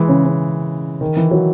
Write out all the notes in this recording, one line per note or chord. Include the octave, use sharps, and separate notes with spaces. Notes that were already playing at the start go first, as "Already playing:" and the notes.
Already playing: E3 G#3
C#3
C#3
D#3
E3
F#3